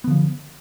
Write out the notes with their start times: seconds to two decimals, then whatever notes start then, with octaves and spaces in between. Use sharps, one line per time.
0.04 B3
0.07 D3
0.11 F3